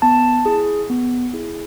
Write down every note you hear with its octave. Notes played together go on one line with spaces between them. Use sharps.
B3 A5
E4 G#4
B3
E4 G#4